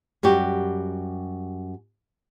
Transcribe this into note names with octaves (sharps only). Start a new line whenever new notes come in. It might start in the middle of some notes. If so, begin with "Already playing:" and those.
F#2 G3 F#4 G4